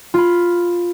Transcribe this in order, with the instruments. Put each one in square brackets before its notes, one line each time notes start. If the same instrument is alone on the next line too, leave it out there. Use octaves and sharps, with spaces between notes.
[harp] F4 B5